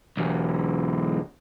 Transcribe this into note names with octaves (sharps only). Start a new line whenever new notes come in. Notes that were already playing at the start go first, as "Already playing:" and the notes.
B1 E2